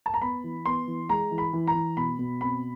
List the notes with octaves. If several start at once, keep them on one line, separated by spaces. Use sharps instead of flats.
A5
A#5
B3 B5
E3
B3 C6
E3
G#3 A#5
E3
B5
E3
A#5
E3
B2 B5
B2
C4 B5